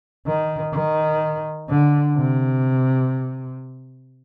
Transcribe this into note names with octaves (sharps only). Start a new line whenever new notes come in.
D#3
D#3
D3
C3